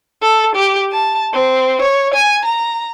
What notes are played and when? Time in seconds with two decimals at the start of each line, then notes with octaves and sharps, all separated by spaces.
0.22 A4
0.56 G4
0.92 A5
1.33 C4
1.82 C#5
2.14 G#5
2.45 A#5